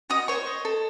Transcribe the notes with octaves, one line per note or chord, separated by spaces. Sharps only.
F#4 D#5 D#6
C5 C#5 C#6
D#5
A4